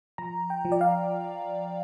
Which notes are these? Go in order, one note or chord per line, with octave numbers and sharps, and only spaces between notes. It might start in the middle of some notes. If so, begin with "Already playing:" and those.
F3 A#5
G5
F3
D5
F5